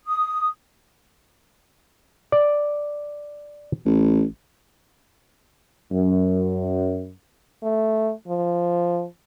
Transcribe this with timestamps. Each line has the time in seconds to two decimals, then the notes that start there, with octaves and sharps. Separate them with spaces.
0.04 D#6
2.32 D5
3.85 A1
5.92 F#2
7.62 A3
8.28 F3